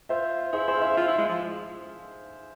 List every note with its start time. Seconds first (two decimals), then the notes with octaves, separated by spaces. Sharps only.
0.09 F4 C5 E5
0.52 E4 G#4 C5
0.68 G#4 C5
0.75 F5
0.81 C5 E5
0.97 F4
1.08 E4
1.18 G#3
1.29 F3